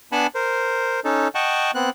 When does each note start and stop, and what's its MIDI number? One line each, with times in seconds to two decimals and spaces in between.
0.12 0.27 59
0.12 0.27 62
0.12 0.27 78
0.12 0.27 80
0.12 0.27 81
0.12 0.27 83
0.35 1.00 70
0.35 1.00 72
1.05 1.28 61
1.05 1.28 63
1.05 1.28 69
1.35 1.71 75
1.35 1.71 78
1.35 1.71 79
1.35 1.71 81
1.35 1.71 85
1.75 1.90 59
1.75 1.90 60
1.75 1.90 90